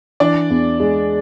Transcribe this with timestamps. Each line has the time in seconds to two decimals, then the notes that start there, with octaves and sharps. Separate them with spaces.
0.20 E3 D4 D5
0.50 E2
0.80 G#3